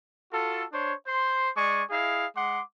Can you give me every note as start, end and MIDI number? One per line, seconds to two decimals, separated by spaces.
0.32 0.64 65
0.32 0.64 66
0.32 0.64 69
0.72 0.93 62
0.72 0.93 72
0.72 0.93 73
1.06 1.50 72
1.06 1.50 84
1.56 1.82 56
1.56 1.82 74
1.56 1.82 80
1.56 1.82 85
1.90 2.25 64
1.90 2.25 68
1.90 2.25 75
1.90 2.25 77
2.35 2.61 56
2.35 2.61 78
2.35 2.61 84
2.35 2.61 86